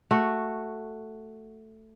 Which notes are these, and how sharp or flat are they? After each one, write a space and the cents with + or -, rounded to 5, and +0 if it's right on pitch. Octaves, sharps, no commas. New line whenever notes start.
A3 +5 F#4 +0